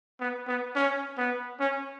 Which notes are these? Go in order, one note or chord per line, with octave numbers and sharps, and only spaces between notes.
B3
B3
C#4
B3
C#4